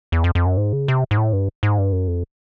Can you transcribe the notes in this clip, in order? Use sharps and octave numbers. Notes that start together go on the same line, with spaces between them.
E2
F2
F2
F#2
G#2
C#3
C3
G#2
A2
G2
G#2
G2
F#2
F2